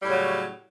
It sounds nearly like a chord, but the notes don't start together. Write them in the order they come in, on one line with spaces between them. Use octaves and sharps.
G3 A2 C#3 F#3